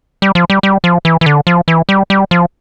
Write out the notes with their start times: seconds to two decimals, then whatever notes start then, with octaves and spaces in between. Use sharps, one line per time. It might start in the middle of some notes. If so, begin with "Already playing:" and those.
0.22 G3
0.35 F3
0.50 G3
0.63 G3
0.84 F3
1.05 E3
1.21 E3
1.26 D3
1.47 F3
1.68 E3
1.89 G3
2.10 G3
2.31 F3